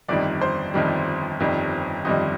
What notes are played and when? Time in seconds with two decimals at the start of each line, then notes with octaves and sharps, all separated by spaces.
0.08 G1 F2 D#3 G3 D5
0.41 C5
0.74 G1 F2 D#3 G3
1.40 G1 F2 D#3 G3
2.05 G1 F2 D#3 G3 D#5